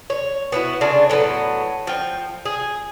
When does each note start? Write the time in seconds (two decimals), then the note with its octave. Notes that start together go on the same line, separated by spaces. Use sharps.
0.10 C#5
0.52 B3 E4 F#4
0.81 C#3 D4 F4 G#4
1.10 A2 F#3 A3 B3
1.87 F3 G5
2.46 G#4